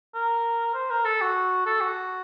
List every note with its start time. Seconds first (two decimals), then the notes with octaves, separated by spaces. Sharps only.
0.15 A#4
0.74 C5
0.91 A#4
1.05 A4
1.21 F#4
1.66 A4
1.81 F#4